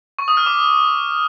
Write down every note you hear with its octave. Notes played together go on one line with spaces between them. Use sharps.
C#6
D#6
F6
D6